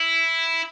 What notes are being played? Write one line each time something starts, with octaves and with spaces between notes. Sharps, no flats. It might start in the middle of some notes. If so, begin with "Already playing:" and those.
Already playing: E4